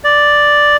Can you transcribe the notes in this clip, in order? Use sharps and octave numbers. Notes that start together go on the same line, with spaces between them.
D5